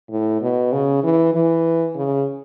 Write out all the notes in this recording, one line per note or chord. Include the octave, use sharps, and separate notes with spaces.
A2
B2
C#3
E3
E3
C#3